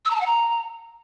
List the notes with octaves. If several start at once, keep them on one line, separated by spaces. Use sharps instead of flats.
E6
A#5
A5
F#5
A#5